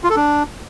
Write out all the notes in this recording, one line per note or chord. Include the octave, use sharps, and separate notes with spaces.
F4
A4
D4